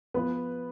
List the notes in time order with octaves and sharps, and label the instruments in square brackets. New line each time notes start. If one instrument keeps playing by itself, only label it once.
[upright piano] F3 B3 F4 B4